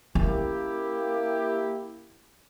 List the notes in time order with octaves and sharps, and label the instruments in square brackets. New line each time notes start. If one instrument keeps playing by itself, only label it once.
[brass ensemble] A#3 E4 G4 [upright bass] C#4